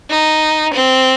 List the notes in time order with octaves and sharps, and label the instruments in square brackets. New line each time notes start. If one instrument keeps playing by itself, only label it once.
[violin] D#4
C4